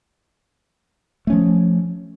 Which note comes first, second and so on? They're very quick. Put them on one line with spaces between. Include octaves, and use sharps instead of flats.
A3 C#4 F3